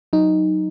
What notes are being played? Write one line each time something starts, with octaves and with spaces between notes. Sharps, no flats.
F#3 D#4